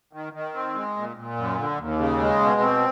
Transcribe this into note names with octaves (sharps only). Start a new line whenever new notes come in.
D#3
D#3
C4
G#3
A#2
A#2
F#2
D3
D#2
C#3
G#3
B2
C4